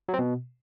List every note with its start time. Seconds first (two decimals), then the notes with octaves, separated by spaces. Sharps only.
0.09 F#3
0.14 C4
0.19 B2